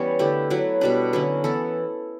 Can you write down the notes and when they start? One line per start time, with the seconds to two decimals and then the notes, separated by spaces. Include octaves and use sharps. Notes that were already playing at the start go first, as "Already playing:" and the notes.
Already playing: E3 G3 B3 C#4 C#5
0.19 D3 A3 E4 G4
0.50 F#3 A3 E4 B4
0.81 B2 G3 D4 B4
1.13 D3 F#3 C#4 E4 B4
1.44 E3 B3 E4 A4